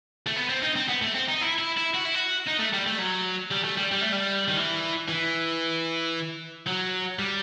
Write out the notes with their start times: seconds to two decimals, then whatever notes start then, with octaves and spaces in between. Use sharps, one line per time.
0.27 A3
0.36 B3
0.49 C4
0.62 D#4
0.76 C4
0.89 B3
1.02 A3
1.15 C4
1.29 D#4
1.41 E4
1.59 E4
1.77 E4
1.94 F#4
2.05 E4
2.14 F#4
2.47 D#4
2.59 A3
2.73 G3
2.86 A3
2.98 F#3
3.51 G3
3.64 A3
3.77 G3
3.91 G3
4.01 A3
4.12 G3
4.48 D#3
4.57 E3
5.09 E3
6.67 F#3
7.19 G3